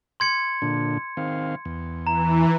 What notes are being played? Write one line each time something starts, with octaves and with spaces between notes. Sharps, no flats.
C6 G#6 C#7
A#2 D3 D4
D#3 C4 F5
E2
E3 A#5